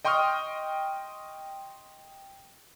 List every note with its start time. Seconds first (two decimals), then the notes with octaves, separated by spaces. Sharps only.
0.05 D#5 G5 C6 C#6 D#6 F6